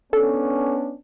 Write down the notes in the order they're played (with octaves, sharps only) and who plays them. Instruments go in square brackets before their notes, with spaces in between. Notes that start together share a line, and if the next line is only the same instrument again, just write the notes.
[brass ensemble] B3 C#4 D4 [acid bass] A4